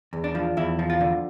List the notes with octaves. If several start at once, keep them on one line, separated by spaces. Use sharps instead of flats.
E2
D4
F3
E2 E4
F3
F4
D3